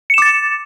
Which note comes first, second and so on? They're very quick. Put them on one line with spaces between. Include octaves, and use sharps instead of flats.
C#7 E7 D6 A6